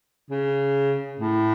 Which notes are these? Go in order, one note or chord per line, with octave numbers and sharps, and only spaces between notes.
C#3
A2